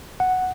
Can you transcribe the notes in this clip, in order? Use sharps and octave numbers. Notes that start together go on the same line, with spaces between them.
F#5